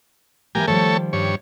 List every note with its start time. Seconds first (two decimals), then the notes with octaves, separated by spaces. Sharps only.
0.55 E3 F#3 A#3 G4 A#4 G#5
0.68 D#3 F3 G3 A3 A4 C#5
1.13 G2 C#5